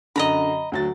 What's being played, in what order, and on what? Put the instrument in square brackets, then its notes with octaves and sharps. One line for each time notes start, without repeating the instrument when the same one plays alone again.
[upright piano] F#2 D3 [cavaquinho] D#5 A#5 B5
[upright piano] D2 F#3 A6